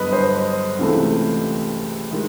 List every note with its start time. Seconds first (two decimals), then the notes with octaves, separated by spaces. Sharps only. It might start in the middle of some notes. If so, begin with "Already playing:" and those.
Already playing: G2 D3 F#3 B3 B4 D#5
0.13 C5
0.79 C#2 C3 E3 A3
2.11 D#3 G#3